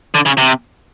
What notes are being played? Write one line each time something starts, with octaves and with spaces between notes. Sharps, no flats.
D3
C#3
C3